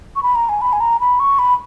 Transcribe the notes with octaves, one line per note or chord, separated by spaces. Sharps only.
C#6
B5
A#5
G#5
B5
G#5
A#5
B5
C#6
B5